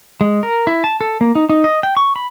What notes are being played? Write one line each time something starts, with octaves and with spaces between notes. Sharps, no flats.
G#3
A#4
E4
A5
A4
A#3
D#4
D#4
D#5
G5
C#6
B5